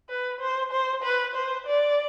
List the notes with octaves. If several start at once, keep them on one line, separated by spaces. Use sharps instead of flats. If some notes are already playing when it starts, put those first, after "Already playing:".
B4
C5
C5
B4
C5
D5